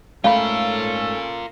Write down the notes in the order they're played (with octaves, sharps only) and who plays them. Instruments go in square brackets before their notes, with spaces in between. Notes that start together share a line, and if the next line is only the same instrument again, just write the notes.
[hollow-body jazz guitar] G#2 A3 B5 [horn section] C#4 A4 [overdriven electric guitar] F4 A#4 [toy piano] F5